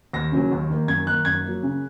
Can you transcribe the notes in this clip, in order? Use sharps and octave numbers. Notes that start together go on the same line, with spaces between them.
D#2 A#6
C#3 F#3 A#3 C#4
D#2
D#3 A#3
F#2 G#6
D#3 A#3 F#6
F#2 G#6
F#3 A#3
C#3